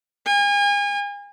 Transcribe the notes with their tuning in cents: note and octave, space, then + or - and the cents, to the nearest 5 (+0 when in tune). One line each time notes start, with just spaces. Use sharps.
G#5 -35